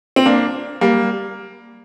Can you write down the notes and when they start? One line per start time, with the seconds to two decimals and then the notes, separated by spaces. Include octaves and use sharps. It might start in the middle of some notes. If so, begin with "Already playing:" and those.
0.16 C4
0.26 A#3 D4
0.81 G3 A#3